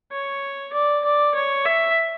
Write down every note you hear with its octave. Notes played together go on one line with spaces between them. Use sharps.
C#5
D5
D5
C#5
E5